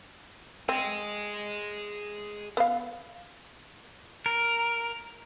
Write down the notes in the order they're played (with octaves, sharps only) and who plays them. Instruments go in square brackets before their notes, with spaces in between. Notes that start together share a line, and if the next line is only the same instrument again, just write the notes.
[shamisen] C4 [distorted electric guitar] G#4 D#5
[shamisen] B3 F5
[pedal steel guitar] A#4